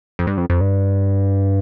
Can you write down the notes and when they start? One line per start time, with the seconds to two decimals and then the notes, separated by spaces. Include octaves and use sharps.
0.19 F2
0.27 G2
0.38 F2
0.50 F2
0.61 G2